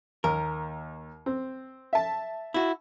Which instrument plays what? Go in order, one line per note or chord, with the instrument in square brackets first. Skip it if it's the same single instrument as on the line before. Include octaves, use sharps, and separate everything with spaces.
[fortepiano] D#2 [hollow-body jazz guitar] A#4
[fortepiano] C4
E5 A5
[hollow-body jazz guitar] E4 F#4